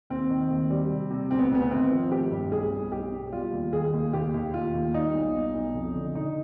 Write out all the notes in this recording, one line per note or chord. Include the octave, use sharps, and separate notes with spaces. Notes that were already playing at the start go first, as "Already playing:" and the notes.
D#2 C4
D#3
D#2
G3
C3
C3
D2 C4
B3
D2 B3
G#1 C4
F3
G#1 G4
G2
B1 G#4
B1
B1 G4
B2
G3 F4
D#2
D#3 G#4
D#2
D#2 G4
D#2
D#2 F4
D#2
G3 D#4
B1
B2
B1
F2
D3
D3 D#4